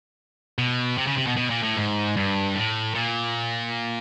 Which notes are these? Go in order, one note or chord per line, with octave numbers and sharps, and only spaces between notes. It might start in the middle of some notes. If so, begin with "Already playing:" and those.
B2
C3
C#3
C3
B2
B2
A#2
A2
G#2
G2
A2
A#2